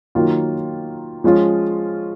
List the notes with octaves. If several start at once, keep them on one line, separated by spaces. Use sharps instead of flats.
D#3 F#3 A#3 F4
F3 G#3 C#4 F4